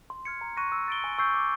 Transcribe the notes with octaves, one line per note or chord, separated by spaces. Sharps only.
C6
F6 G#6 C#7
A#5
C#6 F#6 A#6 D#7
E6
A6 D7 G7
G#5
C#6 E6 G6 C7
D6